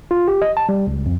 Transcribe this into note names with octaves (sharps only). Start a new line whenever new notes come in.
F4
G4
D#5
A5
G3
C#2
F2